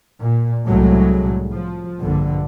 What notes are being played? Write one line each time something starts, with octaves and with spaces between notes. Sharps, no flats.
A#2
C2 A2 F#3 G#3 A3
F3
A#1 G2 D3